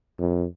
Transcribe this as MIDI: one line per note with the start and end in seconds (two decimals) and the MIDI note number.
0.19 0.45 41